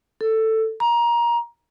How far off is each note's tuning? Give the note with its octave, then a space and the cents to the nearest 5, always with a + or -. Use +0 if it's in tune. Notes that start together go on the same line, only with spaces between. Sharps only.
A4 +10
A#5 +20